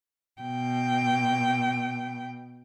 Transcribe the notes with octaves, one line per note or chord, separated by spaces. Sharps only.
B2 G5